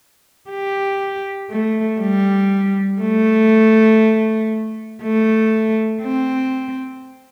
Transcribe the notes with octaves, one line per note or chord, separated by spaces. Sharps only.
G4
A3
G3
A3
A3
C4